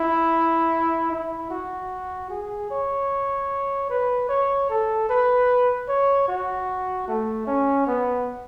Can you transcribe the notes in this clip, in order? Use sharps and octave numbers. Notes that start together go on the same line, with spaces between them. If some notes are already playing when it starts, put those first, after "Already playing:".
Already playing: E4
E4
F#4
G#4
C#5
B4
C#5
A4
B4
C#5
F#4
A3
C#4
B3